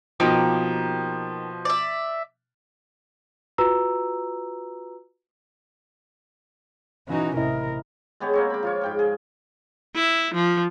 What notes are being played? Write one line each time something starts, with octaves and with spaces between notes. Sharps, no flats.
B2 F3 A#3 D#4 G4
D5 E5
F4 F#4 B4 A#5 E6
E3 C#4 D#4 F#4
A1 C3 E4 A#4 D#5
G#3 B3 G4 C#5
A#3 C4 C#5
B5 D6
F3 F4 C#5
G#2 G5 D6
G#4
E4
F3